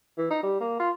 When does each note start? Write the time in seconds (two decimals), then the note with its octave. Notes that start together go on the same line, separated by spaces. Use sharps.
0.18 E3
0.30 D#4
0.43 G3
0.60 A#3
0.79 F4